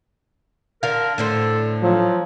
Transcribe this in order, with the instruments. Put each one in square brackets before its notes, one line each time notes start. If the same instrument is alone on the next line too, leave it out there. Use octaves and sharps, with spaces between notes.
[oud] D3 F5 [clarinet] A#4
[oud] A2 D3 C5 [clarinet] A4
[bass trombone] F3 [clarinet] F#3